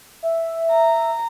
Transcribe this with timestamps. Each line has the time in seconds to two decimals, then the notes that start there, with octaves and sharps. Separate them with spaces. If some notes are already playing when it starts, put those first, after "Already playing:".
0.23 E5
0.70 A#5